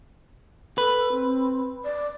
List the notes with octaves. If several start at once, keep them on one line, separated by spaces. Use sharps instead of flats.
A4 B4
C4
D5